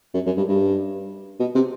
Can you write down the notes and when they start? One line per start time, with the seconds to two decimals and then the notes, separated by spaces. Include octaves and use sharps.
0.14 F#2
0.26 F#2
0.37 G2
0.48 G2
1.39 B2
1.55 C3